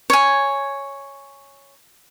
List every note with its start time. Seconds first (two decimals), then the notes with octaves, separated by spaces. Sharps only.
0.10 C#5 G#5